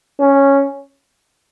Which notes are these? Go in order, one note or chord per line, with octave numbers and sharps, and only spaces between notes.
C#4